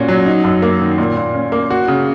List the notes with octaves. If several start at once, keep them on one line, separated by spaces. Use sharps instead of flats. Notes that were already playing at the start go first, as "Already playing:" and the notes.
Already playing: A#2 C#4 F#4
F#3
D#4
F#2
A#3
D#3
A#2
A#2
C#4
A#3
F#4
C#3